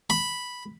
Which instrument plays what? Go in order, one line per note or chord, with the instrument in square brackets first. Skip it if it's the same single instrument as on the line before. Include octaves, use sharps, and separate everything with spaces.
[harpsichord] B5